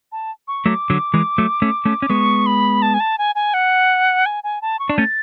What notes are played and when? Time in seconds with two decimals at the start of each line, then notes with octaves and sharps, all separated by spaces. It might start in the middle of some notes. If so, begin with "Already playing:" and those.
0.12 A5
0.48 C#6
0.66 F#3 A3 D6
0.90 D3 F#3
1.14 E3 G#3
1.38 F#3 A3
1.62 A3 C#4
1.85 A3 C#4
2.02 C#4
2.10 G#3 B3 C#6
2.46 B5
2.82 A5
2.94 G#5
3.00 A5
3.18 G#5
3.35 G#5
3.54 F#5
4.26 G#5
4.44 G#5
4.62 A5
4.79 C#6
4.89 D4
4.97 A3 C#4 A6